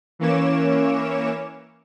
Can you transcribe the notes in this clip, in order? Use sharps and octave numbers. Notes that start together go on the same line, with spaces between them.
E3 A#3 C#4 C#5 D6 E7